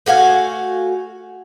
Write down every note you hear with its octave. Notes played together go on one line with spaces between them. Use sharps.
A3 F#4 F5 G#5